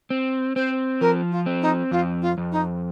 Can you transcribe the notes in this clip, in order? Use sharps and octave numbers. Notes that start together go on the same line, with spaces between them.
C4
C4 C5
F3 A#4
F4
C4
D#4
F2 F4
F4
F2
D#4